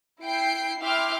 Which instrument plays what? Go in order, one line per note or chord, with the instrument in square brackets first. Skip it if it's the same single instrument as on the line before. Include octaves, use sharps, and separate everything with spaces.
[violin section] E4 G5 C7 D7
E4 E5 G5 C6 D6 F6